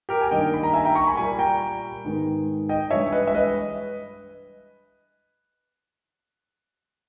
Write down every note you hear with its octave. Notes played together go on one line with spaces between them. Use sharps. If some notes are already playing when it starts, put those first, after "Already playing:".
G4 A#4
G#5
G2 D#3 A#3 D#5 G5
B5
A#5
E5 G#5
G5 A#5
A#5 C#6
G#5 B5
A#2 G3 A#3 G#5 B5
G5 A#5
G#2 D#3 G#3 B3
D#5 G5
G2 E3 G#3 C#5 E5
B4 D#5
E5
B4 D#5